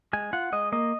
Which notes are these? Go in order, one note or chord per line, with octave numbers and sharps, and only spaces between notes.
G#3 G#5
F4 F#5
G#3 D#5
A#3 D#5